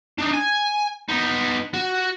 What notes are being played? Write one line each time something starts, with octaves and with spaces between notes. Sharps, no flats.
D4 D#4
G#5
B3 D#4
F#4